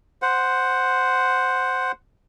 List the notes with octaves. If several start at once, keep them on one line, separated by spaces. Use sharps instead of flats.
C5 F#5